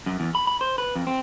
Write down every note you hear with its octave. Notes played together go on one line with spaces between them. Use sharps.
F#2
E2
B5
B5
C5
B4
F2
C4